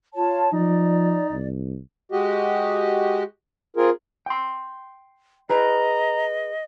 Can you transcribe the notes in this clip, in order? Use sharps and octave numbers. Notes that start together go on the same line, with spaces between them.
F4 C#5 A5
F3 D#4 D5
C2
G#3 F#4 G4 D#5
C4 F4 G#4 A#4
G5 C6
G#4 B4 D#5 A#5